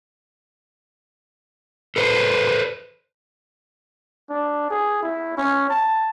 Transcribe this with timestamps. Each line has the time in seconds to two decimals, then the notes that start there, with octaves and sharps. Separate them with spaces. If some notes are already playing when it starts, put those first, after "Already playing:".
1.96 A4 B4 C5
4.30 D4
4.70 G#4
5.03 E4
5.37 C#4
5.70 A5